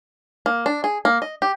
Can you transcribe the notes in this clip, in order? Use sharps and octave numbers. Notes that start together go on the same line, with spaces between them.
A#3
D4
G#4
A#3
D#5
G4